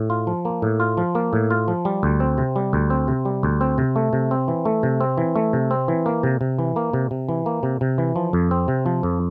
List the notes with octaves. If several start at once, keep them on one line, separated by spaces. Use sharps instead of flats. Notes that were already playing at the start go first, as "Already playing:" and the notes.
Already playing: A2
F4
F3
A#3
A2
F4
F3
A#3
A2
F4
F3
G3
D2
C4
C3
G3
D2
C4
C3
G3
D2
C4
C3
A3
C3
C4
E3
A3
C3
C4
E3
A3
C3
C4
E3
A#3
C3
C3
E3
A#3
C3
C3
E3
A#3
C3
C3
E3
F3
F2
C4
C3
F3
F2